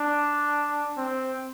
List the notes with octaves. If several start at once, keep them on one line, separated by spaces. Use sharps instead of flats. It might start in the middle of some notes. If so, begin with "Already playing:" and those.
Already playing: D4
C4